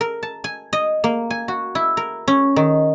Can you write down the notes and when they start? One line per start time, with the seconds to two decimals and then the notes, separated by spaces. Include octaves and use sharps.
0.01 A#4
0.23 A5
0.44 G#5
0.73 D#5
1.04 A#3
1.30 G#5
1.48 F#4
1.75 E4
1.97 A#4
2.28 C#4
2.56 D#3